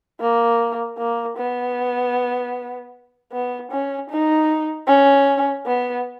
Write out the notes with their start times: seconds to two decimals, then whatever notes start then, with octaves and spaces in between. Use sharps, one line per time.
0.20 A#3
0.98 A#3
1.37 B3
3.32 B3
3.71 C#4
4.10 D#4
4.87 C#4
5.66 B3